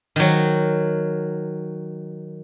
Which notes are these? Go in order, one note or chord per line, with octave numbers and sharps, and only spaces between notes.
D#3 F#3